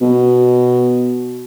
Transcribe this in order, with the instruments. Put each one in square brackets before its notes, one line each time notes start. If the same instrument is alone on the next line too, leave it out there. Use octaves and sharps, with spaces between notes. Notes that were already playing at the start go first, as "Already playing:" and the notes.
[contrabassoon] B2